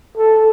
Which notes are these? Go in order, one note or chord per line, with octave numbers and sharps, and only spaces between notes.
A4